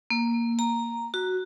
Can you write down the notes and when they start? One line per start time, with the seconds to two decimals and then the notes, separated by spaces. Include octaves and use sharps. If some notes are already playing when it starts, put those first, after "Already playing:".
0.10 A#3
0.59 A#5
1.14 F#4